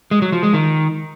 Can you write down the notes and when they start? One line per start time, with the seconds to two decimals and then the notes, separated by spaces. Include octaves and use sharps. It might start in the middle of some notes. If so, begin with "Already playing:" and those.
0.11 G#3
0.22 F#3
0.32 F3
0.43 G#3
0.53 D#3